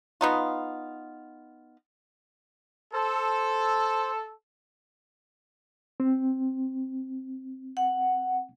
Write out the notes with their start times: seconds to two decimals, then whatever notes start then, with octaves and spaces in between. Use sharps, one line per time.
0.21 B3 D#4 F4
2.94 A4 C5
6.00 C4
7.77 F#5